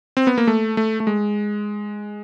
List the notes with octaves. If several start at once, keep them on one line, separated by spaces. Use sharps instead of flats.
C4
B3
A#3
A3
A3
A3
G#3